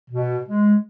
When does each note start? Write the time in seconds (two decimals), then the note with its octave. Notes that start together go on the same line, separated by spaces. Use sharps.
0.09 B2
0.45 G#3